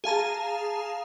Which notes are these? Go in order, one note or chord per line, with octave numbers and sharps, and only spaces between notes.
G#4 F5 A5 A#5